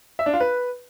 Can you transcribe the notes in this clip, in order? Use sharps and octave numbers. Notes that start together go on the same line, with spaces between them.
E5
D4
F4
B4